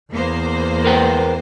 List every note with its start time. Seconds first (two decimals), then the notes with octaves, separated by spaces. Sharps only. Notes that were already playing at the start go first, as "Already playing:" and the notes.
0.13 E2 A#3 B3 C5
0.84 A#4 B4 G5